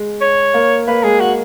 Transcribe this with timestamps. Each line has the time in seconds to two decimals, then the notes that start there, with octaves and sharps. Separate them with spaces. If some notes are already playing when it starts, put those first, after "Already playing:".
Already playing: G#3
0.21 C#5
0.54 A#3
0.87 A#3 B4
1.04 G#3 G#4
1.20 F#4